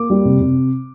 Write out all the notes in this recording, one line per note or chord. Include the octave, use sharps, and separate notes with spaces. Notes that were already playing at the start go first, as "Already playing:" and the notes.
Already playing: A#3 D6
G3
C3
C3